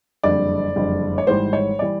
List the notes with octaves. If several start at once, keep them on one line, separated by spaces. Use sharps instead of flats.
F#1 F2 D3 G3 D5
F#1 F2 D3 G3
C#5
G#1 G#2 E3 G3 C5
C#5
E3 G3 D5